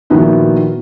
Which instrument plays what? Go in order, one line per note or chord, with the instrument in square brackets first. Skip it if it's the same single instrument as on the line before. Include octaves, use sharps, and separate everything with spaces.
[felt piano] A#2 D#3 F3 B3 E4 F#4